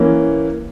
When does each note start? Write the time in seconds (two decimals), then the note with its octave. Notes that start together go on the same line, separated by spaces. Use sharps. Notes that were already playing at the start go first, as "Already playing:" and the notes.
Already playing: E3 A#3 C#4